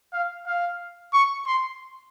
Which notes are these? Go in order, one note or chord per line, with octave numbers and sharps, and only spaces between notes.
F5
F5
C#6
C6